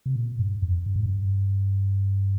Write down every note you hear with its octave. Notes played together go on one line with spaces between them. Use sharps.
C3
A#2
G2
F2
G2
G#2
G2